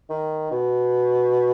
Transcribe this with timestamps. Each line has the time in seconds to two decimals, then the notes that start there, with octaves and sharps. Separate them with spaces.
0.10 D#3
0.51 B2